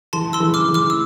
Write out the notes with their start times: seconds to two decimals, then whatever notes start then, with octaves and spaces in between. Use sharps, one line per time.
0.13 E3 A5 C6
0.33 C6 E6
0.40 E3
0.54 D6 F6
0.68 E3
0.74 D6 F6
0.90 E6